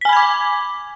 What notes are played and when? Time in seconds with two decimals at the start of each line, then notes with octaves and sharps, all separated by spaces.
0.01 B6
0.05 G#5
0.09 B5
0.13 G#6
0.17 D6